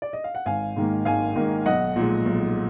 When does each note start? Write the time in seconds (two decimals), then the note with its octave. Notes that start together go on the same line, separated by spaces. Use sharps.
0.02 D5
0.13 D#5
0.24 F5
0.35 F#5
0.46 G#1 F5 G#5
0.76 G#2 D#3 A#3
1.05 G#1 F5 G#5
1.36 G#2 D#3 A#3
1.66 B1 D#5 F#5
1.96 A#2 F3 G#3
2.26 B1